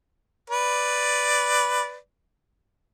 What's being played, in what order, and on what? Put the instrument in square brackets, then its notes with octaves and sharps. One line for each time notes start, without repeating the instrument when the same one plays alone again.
[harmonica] B4 D5